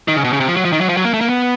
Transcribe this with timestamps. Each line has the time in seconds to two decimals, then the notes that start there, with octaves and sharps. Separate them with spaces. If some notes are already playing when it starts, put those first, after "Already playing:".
0.08 D#3
0.16 C#3
0.24 B2
0.33 C#3
0.40 C3
0.48 F3
0.57 F#3
0.65 F3
0.72 D#3
0.81 F#3
0.89 F3
0.97 F#3
1.05 A#3
1.13 A3
1.21 A#3
1.29 B3